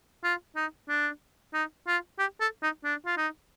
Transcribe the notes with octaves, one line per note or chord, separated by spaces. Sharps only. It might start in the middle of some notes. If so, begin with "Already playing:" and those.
F4
D#4
D4
D#4
F4
G4
A4
D#4
D4
F4
D#4